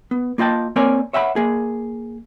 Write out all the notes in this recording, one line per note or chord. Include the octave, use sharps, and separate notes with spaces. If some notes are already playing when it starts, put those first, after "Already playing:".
B3
A#3 F4 D#5 G5 A5
A#3 C4 A#4 C#5 D5 G#5
C#5 E5 F#5 G5 B5
A#3 G#4